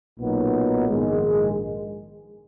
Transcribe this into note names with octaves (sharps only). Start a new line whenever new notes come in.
B1 A#2 F#3 B3 D#4
A#1 G#2 D#3 G#3